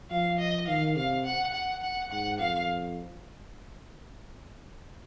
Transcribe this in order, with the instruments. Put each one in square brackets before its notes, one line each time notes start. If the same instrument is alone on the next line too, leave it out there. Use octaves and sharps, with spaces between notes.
[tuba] F3 [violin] F5
[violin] D#5
[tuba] D#3 [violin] F5
[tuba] C3 [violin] F5
[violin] F#5
F#5
F#5
[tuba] G#2 [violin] F#5
[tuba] F2 [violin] F5